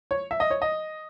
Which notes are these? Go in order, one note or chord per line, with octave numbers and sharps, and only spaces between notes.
C#5
E5
D#5
C#5
D#5